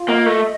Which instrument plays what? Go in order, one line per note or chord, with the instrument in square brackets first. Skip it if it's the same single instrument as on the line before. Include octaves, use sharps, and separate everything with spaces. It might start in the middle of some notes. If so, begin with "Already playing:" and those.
Already playing: [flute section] F4
[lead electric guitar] A#3 [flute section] D#5
[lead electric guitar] A3